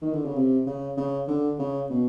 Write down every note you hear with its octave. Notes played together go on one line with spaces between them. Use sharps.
D#3
D3
C#3
C3
C#3
C#3
D3
C#3
B2